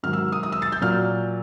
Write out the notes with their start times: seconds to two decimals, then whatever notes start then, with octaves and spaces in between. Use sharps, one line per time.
0.03 G#2 D#3 F#3 F6
0.13 E6
0.32 D#6
0.43 D#6
0.52 E6
0.62 A6
0.72 G6
0.81 A#2 F#3 A#3 F6